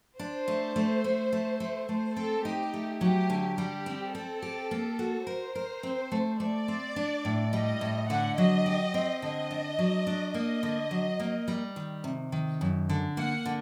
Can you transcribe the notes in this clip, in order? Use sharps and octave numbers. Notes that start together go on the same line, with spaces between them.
D4 C5
A3
A3
A3
A3
A3
A3 C5
C4 A4
D#4 G4
A3
F#3 G4
D3
G3 G4
C4
C4 A4
G4
A#3
F#4
A#4 C5
A#4
C4
A3
A3 D5
C4
D4
A2
G3 D#5
A2
D3 F#5
F#3 D#5
G4
C4
D3 D#5
D4
F#3
D4
A#3 D#5
D3
F#3
A#3
G3
D#3
C3
D#3
F#2
D3
A#3 F#5
D3